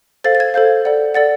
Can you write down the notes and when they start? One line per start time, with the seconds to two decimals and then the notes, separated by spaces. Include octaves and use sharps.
0.24 A4 C5 F5 A6
0.35 A6
0.40 G#6
0.54 A4 C5 F5 G6
0.85 A4 D5 F#5
1.15 A4 D5 F#5 A6